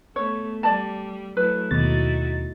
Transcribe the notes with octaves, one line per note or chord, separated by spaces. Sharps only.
A3 B3 C#5
G3 D5 A5
F#3 A3 E4 B4
D#2 B2 D#4 E4 F#4 A6